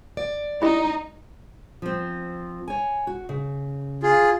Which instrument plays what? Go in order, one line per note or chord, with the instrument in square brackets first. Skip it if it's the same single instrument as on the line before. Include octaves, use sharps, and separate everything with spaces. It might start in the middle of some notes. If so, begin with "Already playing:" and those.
[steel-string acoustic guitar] D5
[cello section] D#4 [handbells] E4 G4 D#5
[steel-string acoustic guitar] F3 C4
C#5 G#5
F#4
C#3
[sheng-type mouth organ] F4 G#4